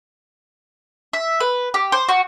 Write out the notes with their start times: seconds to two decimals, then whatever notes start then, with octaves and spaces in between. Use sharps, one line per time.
1.13 E5
1.40 B4
1.74 G4
1.92 C5
2.08 F#4